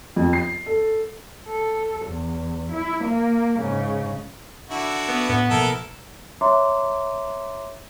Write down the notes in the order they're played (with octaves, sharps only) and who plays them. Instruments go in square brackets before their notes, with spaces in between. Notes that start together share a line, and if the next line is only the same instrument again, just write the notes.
[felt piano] F2
C7
A4
[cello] A4
E2
E4
A#3
G#2 C#3
[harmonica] D3 E4 F#4
[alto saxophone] B3
[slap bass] A2 [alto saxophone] B3
[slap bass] B2 F3 A#3 [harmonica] E4 A4 A#4
[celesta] C#5 E5 A#5 C6 D6